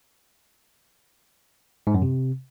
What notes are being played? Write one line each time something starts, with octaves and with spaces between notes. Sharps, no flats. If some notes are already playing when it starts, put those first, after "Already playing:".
G#2
F#2
C3